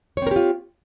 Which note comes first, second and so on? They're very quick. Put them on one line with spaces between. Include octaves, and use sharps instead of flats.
C#5 C4 A#4 G4 F4